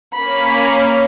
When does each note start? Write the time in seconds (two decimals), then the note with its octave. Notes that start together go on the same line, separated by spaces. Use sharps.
0.15 A#3 C#4 B5